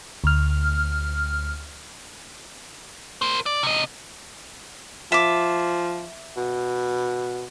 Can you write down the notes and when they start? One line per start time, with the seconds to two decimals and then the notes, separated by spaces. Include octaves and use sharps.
0.24 D2 F6
3.22 A#4 C5
3.46 D5
3.63 C3 D#5
5.12 F3 E5 D6
6.37 B2